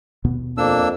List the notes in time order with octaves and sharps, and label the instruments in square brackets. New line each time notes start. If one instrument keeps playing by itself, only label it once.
[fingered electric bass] D#2 B2 B3
[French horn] F2 [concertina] A#3 D4 E6